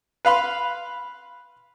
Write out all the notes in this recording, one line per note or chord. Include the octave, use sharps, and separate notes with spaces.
B4 F5 B5 C6